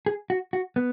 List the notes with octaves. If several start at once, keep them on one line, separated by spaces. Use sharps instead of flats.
G#4
F#4
F#4
B3